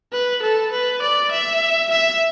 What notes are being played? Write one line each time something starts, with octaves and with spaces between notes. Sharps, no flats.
B4
A4
B4
D5
E5
E5